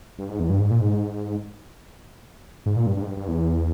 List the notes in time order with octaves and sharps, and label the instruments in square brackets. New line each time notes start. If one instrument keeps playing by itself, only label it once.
[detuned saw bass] G2
G#2
E2
G2
G#2
A#2
G#2
G#2
A#2
G2
G2
G#2
G2
G2
E2